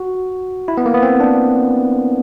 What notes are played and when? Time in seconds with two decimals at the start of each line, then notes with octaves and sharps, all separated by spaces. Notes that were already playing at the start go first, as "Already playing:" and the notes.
Already playing: F#4
0.68 E4
0.77 B3
0.86 A#3
0.94 B3
1.03 C4
1.20 D4